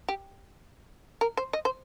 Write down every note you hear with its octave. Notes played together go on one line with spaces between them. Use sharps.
G4
A#4
C5
D#5
C5